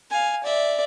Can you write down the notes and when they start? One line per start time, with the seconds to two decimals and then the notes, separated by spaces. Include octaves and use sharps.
0.11 F5 G#5
0.43 D5 E5